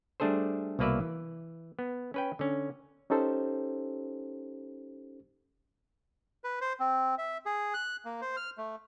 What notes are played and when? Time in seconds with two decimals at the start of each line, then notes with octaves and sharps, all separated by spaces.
0.20 G3 A3 D4 G#4 A4 C5
0.79 C2 B2 A#3 B4 D5 E5
1.00 E3
1.79 B3
2.14 C#4 B4 G5
2.39 D3 C#4
3.10 C#4 D#4 G4 A4 C5
6.44 B4
6.61 C5
6.80 C4
7.18 E5
7.46 G#4
7.74 F#6
8.05 A#3
8.21 C5
8.37 F6
8.58 A3